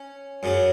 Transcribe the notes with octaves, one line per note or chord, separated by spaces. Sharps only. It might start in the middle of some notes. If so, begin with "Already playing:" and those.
Already playing: C#4
F#2 C#3 F#3